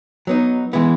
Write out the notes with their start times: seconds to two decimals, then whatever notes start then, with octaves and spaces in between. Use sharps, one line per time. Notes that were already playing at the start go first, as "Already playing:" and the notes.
0.27 F#3 B3 D#4
0.73 E3 G#3 B3 E4